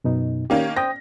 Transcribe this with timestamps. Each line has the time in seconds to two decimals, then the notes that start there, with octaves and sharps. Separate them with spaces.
0.04 F#2 B2 D#4
0.50 D#3 A#3 C#4 G4
0.76 C5 G5 D#6 A#6